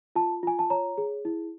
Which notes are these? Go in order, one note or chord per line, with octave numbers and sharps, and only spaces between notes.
F4 A5
F4 G#5
A5
C#5 A#5
G#4
E4